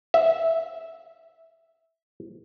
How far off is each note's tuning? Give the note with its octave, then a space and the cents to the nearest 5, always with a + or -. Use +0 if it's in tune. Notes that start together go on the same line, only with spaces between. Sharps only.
E5 -10